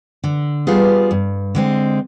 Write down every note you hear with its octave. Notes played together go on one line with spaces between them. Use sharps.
D3
G3 B3 F4 G#4
G2
D3 G#3 C4